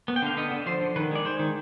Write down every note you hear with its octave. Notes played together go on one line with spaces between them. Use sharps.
B3
G5
D3 F5
B3 D#5
D3
F3 C5
D3
D#3 B4
G#3 D5
G#3 C5
D#3